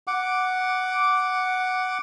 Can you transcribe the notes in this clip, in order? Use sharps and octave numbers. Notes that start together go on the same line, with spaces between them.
F#5 D6